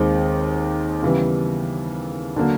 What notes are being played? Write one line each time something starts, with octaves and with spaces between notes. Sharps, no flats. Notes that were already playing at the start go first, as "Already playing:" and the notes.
Already playing: D#2 D#3 G#3 C4 D#4
C#3 E3 G3 B3
D3 F#3 A#3